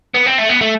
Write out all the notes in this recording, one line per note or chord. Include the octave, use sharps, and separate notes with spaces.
B3
C4
A3
B3
A3